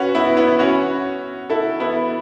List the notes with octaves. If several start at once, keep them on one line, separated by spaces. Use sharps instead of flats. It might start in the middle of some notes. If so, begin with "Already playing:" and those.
Already playing: C#4 F#4 B4
B3 E4
B3 E4
C#4 F#4
E4 A4
B3 E4